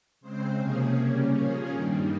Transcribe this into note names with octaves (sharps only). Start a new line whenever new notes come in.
C#3 G#3 C4 C5
C3 F3 A#3 C#4 G#4
C#3 G3 A#3 C#4
A#2 F3 A#3 C#4 G#4
G2 D#3 G3 A#3